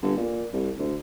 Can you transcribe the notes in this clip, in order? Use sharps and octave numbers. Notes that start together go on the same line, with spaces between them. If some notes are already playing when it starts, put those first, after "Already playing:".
G1
A#2
C2
D2